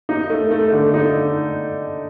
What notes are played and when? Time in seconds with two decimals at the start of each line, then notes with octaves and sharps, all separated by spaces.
0.09 D#4
0.30 A3
0.51 A3
0.72 D3
0.94 D#4